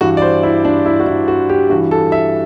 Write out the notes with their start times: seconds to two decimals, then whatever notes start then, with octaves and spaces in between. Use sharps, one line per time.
0.01 G2 E3 F#4
0.17 D5
0.22 C5
0.43 E4
0.65 D4
0.86 E4
1.00 F#4
1.06 E4
1.28 F#4
1.49 G4
1.70 G2 E3 F#4
1.91 A4
2.12 E5